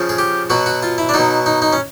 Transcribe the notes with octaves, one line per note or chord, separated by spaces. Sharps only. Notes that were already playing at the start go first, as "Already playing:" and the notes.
Already playing: C#3 F3
G#4
G4
B2 F#3 F#4
F#4
F4
E4
D4
B2 F#3 D#4
D#4
D#4
C#4